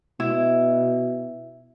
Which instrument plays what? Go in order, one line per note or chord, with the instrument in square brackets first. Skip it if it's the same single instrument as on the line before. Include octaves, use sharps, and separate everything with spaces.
[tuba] B2 [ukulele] E4